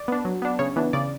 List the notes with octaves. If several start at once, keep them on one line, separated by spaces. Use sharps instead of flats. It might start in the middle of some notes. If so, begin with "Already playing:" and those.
Already playing: D5
B3 D4
F#3
B3 D4
C#3 C#5
E3 B3 D4
C#3 D5